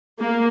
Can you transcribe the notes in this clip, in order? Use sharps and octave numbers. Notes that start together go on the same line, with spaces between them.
A#3